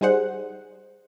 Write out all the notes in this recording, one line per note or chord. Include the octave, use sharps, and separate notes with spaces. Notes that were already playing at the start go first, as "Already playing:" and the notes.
G3 D#4 G#4 C5 F#5